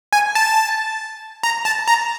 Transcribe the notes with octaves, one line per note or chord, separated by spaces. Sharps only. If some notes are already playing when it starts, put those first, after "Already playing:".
G#5
A5
A#5
A5
A#5